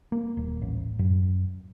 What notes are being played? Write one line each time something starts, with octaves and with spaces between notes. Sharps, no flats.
A#3
D#1
A1
F#2